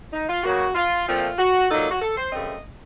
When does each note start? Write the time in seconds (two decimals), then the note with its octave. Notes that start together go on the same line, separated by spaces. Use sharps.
0.12 D#4
0.28 F4
0.44 C#3 F#3 A#3 F#4
0.75 F4
1.06 A#2 F3 A3 C4 F4
1.38 F#4
1.69 A#2 F#3 A#3 D#4 A4
1.80 A4
1.90 F#4
2.00 A4
2.16 C5
2.32 F#2 C#3 A3 C4 D#5